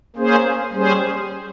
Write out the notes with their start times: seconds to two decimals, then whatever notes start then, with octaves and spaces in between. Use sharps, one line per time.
0.16 A#3 C#4 G#4 C5
0.73 G3 C#4 G#4 C5